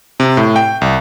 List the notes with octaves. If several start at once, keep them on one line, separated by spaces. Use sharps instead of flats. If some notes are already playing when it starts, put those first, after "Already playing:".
C3
A2
G5
C2